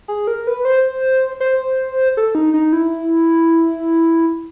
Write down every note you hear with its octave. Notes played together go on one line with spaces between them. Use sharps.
G#4
A#4
B4
C5
C5
A4
D#4
D#4
E4